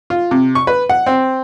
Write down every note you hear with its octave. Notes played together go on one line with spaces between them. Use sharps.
F4
C3
C#6
B4
F#5
C4